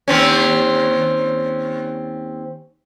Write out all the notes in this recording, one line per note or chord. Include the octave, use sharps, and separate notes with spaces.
D#2 C4 C#4